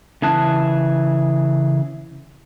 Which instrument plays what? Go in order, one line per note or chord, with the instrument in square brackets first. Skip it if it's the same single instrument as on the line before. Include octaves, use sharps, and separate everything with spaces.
[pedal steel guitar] C#3 E3 G#4 A5 F#6